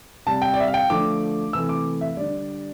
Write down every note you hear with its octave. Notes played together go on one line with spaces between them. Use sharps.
C3 G3 A5
G5
D5
E5
F5
G5
D3 F3 A3 D6
C3 E3 A3 E6
D6
E5
D3 G3 D5